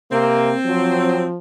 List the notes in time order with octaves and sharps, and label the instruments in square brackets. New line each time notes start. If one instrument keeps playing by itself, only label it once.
[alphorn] C3 [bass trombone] A#3 [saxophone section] C4
[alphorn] F3 [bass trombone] F#3